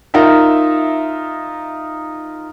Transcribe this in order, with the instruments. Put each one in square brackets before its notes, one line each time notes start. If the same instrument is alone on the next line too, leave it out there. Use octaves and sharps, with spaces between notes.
[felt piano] D#4 F4 A#4 E5